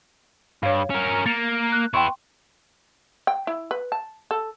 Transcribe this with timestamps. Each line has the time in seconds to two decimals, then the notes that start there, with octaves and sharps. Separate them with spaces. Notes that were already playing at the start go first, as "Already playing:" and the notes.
0.63 G2 C#5 F5
0.90 C#4 A#4
1.26 A#3 A6 C#7 F7
1.72 F#6
1.94 B3 E4 G5 C6 C#6
3.27 G5
3.47 E4
3.71 B4
3.92 A5
4.31 A4